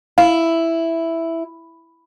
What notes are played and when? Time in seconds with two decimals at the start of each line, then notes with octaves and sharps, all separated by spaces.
0.18 E4 F5